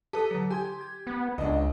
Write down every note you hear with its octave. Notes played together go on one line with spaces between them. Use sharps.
G4 A4 B4 D#6
D3 F#3
G4 G#5 C6 G#6
G#6
B3
C#2 D4 D#5